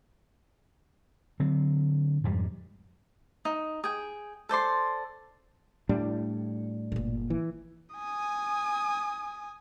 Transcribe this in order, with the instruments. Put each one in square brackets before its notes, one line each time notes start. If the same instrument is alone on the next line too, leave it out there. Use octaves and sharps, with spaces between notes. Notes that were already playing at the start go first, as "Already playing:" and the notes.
[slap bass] D3 F#3 C4
F2 G#2 G3 G#3
[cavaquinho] D#4
G#4 G5
A4 C5 D5 C6
[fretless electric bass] A2 G3 D4
[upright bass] G1 A#2
[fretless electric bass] E3
[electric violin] G#5 D#6